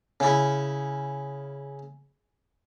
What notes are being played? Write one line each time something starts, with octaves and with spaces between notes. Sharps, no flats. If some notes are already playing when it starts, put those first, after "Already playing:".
C#3 E4